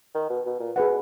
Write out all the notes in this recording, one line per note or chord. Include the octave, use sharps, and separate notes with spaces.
D#3
B2
B2
A#2
B2 G#4 B4 F#5